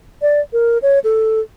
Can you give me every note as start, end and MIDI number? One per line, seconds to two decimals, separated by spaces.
0.22 0.41 74
0.53 0.78 70
0.82 0.99 73
1.04 1.40 69